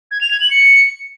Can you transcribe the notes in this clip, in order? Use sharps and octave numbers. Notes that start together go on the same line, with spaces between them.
G#6
F7
G#6
F#7
C#7